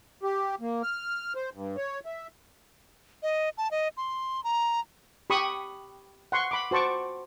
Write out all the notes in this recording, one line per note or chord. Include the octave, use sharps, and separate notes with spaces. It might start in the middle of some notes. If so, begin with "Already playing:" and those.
G4
A#3
F6
C5
G2
C#5
E5
D#5
A5
D#5
C6
A#5
G4 B5 C#6 D#6
F#5 C6 C#6
B5 D6
F#4 C5 A5 C#6 D6